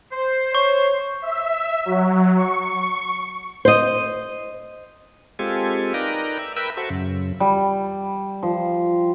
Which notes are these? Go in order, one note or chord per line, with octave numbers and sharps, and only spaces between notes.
C5
C#5 C#6
E5
F#3
C#6
C5 D#5
G#3 C4 F4 G4 A4 G#5
D#4 A#4 B4 D5 G5 A#5
E5
A#4 B4 E5 G5 B5 E6
F#4 A4 C5 E5
F#2 C#3
G3
F3